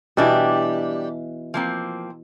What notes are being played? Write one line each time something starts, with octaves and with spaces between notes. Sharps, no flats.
B2 E3 G3 D4 E4 G4
F3 A#3 C4